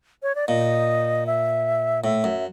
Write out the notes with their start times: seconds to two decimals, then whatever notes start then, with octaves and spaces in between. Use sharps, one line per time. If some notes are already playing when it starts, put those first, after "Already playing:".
0.23 C#5
0.35 D5
0.48 A#2 D#5
1.26 E5
2.04 A2 E5
2.24 F#2